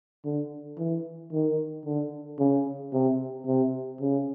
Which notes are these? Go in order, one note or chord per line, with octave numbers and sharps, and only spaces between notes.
D3
E3
D#3
D3
C#3
C3
C3
C#3